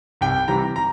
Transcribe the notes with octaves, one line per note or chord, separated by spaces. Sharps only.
C2 G5
C3 E3 G3 A#5
A#5